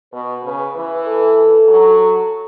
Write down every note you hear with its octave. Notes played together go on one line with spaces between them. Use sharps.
B2 B4
C#3 B4
E3 B4
A4
F#3
A4